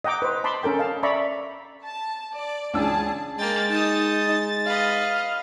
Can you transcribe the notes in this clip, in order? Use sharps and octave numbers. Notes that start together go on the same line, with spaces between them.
D#5 F#5 G5 A#5 D6
B4 C5
A5 B5 C6 D6
C#4 A4 A#4 G5
D#5 F5 A5
D5 E5 A#5 B5 C#6
A5
D5
C#2 D4 G#4 A5 E6
G#3 A#3 G5 A6
D#4 A5 D#6
B4 D#5 F5